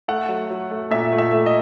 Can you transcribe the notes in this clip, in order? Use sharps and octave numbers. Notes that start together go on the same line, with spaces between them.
A3 F#5
F#3
F#3
A3
A#2 E5
A3
E5
A3
D#5